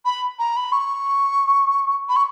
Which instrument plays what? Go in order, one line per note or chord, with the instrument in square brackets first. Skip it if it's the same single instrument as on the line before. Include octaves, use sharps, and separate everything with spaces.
[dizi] B5
A#5
B5
C#6
B5
C#6